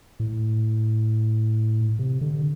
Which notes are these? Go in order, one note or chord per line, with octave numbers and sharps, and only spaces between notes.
A2
C3
D3